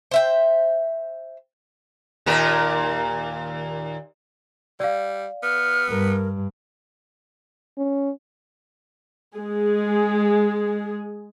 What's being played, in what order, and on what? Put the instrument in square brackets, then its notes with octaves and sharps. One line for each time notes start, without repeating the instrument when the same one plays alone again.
[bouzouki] C5 E5 G5
[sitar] D#2 A#2 A#4
[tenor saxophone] G3 [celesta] D5 F5
[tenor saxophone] B3 [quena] F6
[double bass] G2 [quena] A#4
[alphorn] C#4
[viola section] G#3 G#4